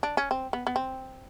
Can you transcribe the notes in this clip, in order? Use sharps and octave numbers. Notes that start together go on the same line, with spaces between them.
D4
C#4
C4
B3
B3
C4